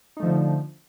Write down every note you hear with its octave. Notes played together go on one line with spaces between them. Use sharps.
D3 F3 A3 D#4